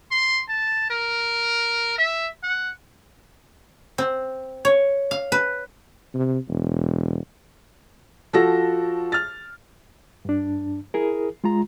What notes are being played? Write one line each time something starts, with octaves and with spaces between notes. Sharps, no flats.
C6
A5
A#4
E5
F#5
C4
C#5
F5
B4
C3
E1
F3 F#4 A4 A#6
F6 A6
G2 D4
E4 G#4 A#4
G#3 F4 A#5